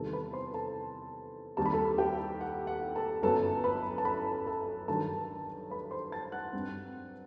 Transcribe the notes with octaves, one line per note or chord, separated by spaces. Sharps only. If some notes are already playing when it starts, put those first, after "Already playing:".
Already playing: E2 C3 D#3 G3 B3 A4 A5
B4 B5
C5 C6
A4 A5
D#2 D#3 G3 C4 A5
B5
A4 A5
G4 G5
F#5
F#5
A4 A5
G1 F#2 F#3 B3 A4 A5
B4 B5
A5
B4 B5
A4 A5
G2 D#3 F#3 A4 A5
B4 B5
C5 C6
A5 A6
F#5 F#6
G2 F#3 C4